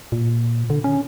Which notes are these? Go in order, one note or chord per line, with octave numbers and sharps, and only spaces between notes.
A#2
D3
C#4